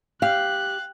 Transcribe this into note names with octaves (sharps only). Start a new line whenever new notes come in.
G4 F5 F#6